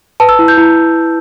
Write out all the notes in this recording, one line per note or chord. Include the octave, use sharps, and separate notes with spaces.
B4 A5
E6
E4
G6
E4